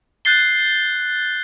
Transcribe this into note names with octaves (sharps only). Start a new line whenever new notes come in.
F#6 G6 A6 C7 G7